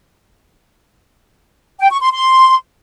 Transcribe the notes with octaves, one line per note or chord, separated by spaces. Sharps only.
G5
C#6
C6
C6